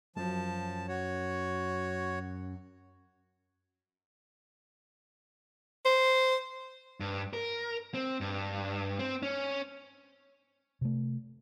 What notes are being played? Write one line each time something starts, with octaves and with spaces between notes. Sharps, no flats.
F#2 F3 A5
F#4 C#5
C5
G2
A#4
C4
G2
C4
C#4
C3 A3